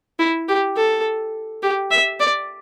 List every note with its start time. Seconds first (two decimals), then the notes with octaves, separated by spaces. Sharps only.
0.19 E4
0.48 G4
0.77 A4
1.63 G4
1.91 E5
2.20 D5